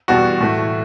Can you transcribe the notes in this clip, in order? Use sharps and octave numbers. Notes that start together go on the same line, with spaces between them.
E2 B2 G3 F#4
A2 E3 A3